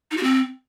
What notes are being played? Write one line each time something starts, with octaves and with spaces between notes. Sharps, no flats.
D#4
F#4
C4